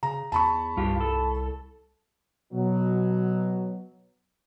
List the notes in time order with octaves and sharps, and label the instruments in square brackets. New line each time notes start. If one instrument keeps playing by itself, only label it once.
[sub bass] C#3 [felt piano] A#5
[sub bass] E2 [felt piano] A5 B5 C#6
[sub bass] C2 [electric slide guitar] G2 F4 G4
[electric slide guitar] A4
[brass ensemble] B2 F#3